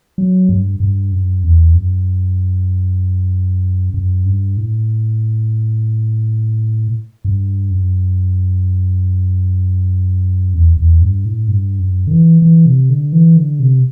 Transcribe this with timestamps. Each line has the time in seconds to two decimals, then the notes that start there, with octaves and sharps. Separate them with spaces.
0.18 F#3
0.49 G2
0.80 G2
1.12 F#2
1.43 E2
1.74 F#2
3.94 F#2
4.26 G2
4.57 A2
7.25 G2
7.71 F#2
10.54 E2
10.77 E2
11.01 G2
11.25 A2
11.48 G2
11.79 F#2
12.07 D3
12.11 E3
12.42 E3
12.66 C3
12.90 D3
13.13 E3
13.37 D3
13.60 C3